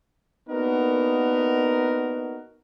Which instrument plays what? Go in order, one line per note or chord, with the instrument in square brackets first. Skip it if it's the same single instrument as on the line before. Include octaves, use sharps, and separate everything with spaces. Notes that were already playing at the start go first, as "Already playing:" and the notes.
[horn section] A#3 B3 D4 D#4 F#4 A#4